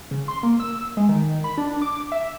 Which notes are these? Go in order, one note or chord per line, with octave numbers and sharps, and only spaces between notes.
C#3
C6
A#3
E6
G#3
D#3
B5
D4
D6
E5